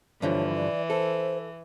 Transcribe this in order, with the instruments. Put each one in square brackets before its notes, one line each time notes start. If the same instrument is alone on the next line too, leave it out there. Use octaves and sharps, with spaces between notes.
[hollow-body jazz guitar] G2 D3 F3 [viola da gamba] E3 [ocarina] C#5
[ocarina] D5
[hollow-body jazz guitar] A4 [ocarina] C5